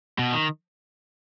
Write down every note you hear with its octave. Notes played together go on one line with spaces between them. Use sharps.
B2
D#3